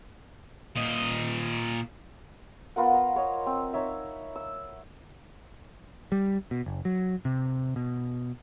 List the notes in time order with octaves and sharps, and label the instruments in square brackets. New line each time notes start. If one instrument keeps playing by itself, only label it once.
[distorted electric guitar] A#2 D#5
[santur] B3 F4 A#4 F#5
A#5
C5 C#5 D#5
C4
D#4 C#5 E5
E6
[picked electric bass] G3
B2
F#1
F#3
C3
B2